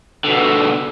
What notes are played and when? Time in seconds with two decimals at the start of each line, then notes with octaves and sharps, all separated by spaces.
0.24 B2 D3